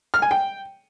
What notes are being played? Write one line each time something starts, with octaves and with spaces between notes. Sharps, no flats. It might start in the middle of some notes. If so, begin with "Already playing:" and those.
F6
G#5
G5